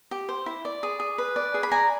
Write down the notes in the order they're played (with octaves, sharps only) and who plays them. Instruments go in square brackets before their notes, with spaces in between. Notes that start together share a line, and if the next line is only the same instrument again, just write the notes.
[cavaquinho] G4
C5
E4
D5
G#4
G#4
B4
D5
G#4
B5
D5 G#5 A#5